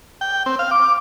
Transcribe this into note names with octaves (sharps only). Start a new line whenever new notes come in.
G5
C4
F5
D6